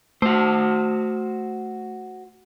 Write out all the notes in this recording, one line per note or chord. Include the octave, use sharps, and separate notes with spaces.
A3 F#4 C5